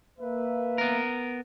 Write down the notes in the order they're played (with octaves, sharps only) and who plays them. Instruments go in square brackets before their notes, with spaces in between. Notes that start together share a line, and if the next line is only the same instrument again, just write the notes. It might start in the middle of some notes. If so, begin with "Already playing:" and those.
[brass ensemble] A#3 B4 E5
[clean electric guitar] B3 A#4